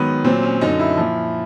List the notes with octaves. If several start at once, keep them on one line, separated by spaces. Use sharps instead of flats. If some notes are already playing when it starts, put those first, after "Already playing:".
Already playing: G#2 D#3 F#3 B3
A#2 F#3 C4
C#4
F#2 D3 F#3 D#4
E4
A#2 F3